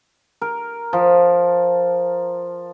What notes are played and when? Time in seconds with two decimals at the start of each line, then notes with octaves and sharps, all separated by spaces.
0.42 A#4
0.93 F3